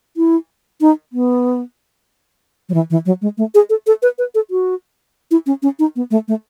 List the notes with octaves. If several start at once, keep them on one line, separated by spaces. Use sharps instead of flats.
E4
D#4
B3
F#3
E3
E3
F#3
G#3
A3
G#4
A4
A4
B4
B4
A4
F#4
E4
C#4
C#4
D#4
B3
A3
A3